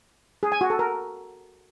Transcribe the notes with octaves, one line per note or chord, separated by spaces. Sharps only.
G#4
G#5
F#4
A4
A#4